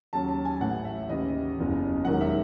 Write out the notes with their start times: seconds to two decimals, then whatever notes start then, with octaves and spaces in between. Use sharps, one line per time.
0.13 D#2 C#3 F#3 A5
0.29 A5
0.45 G#5
0.60 A1 A2 E3 F#5
0.85 E5
1.09 D#2 C#3 E3 D#5
1.57 F#1 E2 C#3
2.05 E1 D#2 D#3 F#3 F#5
2.21 E5